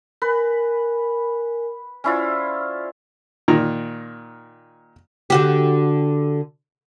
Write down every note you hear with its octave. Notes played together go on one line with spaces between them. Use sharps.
A#4 B4 G#5
C#4 E4 F4 C5 D5
A#2 D#3 A#5
D3 F#4 G4